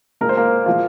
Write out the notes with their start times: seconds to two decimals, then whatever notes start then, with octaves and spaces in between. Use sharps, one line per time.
0.21 A#2 G#3 A#4
0.29 C5
0.37 A#3 A#4
0.66 A#2 F3 G#3 F4